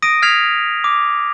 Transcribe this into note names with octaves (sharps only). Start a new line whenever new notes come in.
D#6 A#6 D7 D#7
D#6 F6 G#6 B6 C7 F7
D6